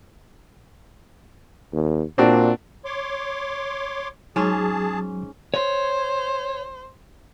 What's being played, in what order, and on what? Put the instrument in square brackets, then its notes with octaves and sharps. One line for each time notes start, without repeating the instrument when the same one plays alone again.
[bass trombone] D#2
[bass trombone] A#2 [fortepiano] C4 D4 F#4
[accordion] C#5 C6 D6
[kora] G#2 C#4 [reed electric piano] F#3 [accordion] G#4 A5
[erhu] C5 [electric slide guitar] C#5